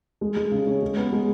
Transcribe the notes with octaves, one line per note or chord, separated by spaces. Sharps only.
G#3
G#3
C#3
C#4
G#3
B3
G#3